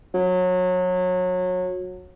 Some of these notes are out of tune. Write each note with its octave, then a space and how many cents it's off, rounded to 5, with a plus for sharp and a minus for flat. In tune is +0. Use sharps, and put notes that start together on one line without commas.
F#3 -25